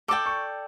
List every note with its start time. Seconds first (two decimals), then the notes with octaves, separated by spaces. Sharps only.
0.08 A4 D5 G5 D6
0.26 C#6